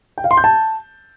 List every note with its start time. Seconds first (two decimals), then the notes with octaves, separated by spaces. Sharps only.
0.18 G5
0.24 F5
0.31 C6
0.37 G6
0.44 A5